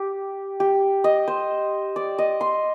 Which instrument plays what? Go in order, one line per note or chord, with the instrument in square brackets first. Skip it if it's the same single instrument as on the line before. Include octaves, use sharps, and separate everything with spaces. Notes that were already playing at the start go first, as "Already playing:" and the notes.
Already playing: [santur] G4
G4
D#5
C5
D5
D#5
C6